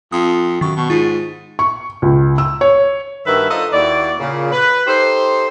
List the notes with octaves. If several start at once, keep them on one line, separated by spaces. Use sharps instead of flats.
F2 D#6
F#2 D#3 C#6
B2
G#2 F4
C#6
C#2
E6
C#5
G2 D#3 F#4 B4 E5
D4 D#4 F4 A4 C5 D#5
D#2 E4 F#4 D5
A#2 C#3
B4
D#4 G4 A4 C5